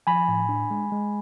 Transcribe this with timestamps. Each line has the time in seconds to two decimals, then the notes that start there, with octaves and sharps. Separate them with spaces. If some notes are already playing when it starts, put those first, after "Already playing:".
0.07 F3 G#5 B5
0.28 A2
0.49 D4
0.71 G#3
0.92 G#3